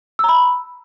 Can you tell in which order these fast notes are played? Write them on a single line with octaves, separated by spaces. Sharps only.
E6 A#5 B5